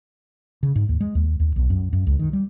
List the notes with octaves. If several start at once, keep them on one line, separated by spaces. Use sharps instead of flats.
C#3
G#2
D#2
G#3
D#2
D#2
B1
F#2
F#2
C#2
D#3
G3